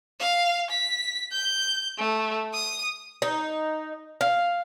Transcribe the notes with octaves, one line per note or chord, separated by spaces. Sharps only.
F5
B6
G6
A3
D#6
D#4
F5